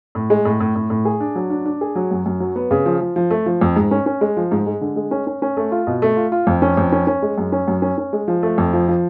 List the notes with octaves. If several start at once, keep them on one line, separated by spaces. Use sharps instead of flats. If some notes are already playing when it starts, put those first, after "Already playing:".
A2
G#3
A2
A2
A2
A2
G#4
D4
F#3
D4
D4
G#4
F#3
F#2
F#2
F#3
B3
C#3
F3
F3
F3
A3
F3
F2
G#2
C#4
C#4
G#3
F3
G#2
G#3
D3
G#3
C#4
C#4
C#4
A3
F4
B2
A3
F4
F4
F2
C#4
F2
C#4
C#4
G#3
F#2
C#4
F#2
C#4
C#4
G#3
F3
A3
F2
F3
F3